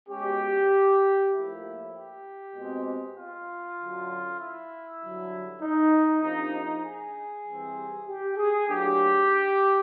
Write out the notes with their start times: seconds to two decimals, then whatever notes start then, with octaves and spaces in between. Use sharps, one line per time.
0.09 B2 G#3 C#4 G4
1.31 A2 F3 A#3 E4
1.93 G4
2.54 B2 G#3 C4
3.15 F4
3.77 F#2 D3 F#3
4.39 E4
5.00 G2 D3 F#3
5.61 D#4
6.22 C3 F3 A#3 D4 D#4
6.53 D#4
6.84 G#4
7.45 C3 E3 G3 C4
8.07 G4
8.37 G#4
8.67 A2 F#3 A#3 D4 G4